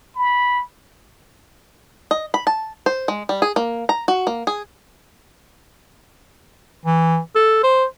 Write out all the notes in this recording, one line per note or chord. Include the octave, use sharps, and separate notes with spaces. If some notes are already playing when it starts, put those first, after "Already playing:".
B5
D#5
B5
A5
C5
G#3
G3
G#4
A#3
A#5
F#4
A#3
G#4
E3
A4
C5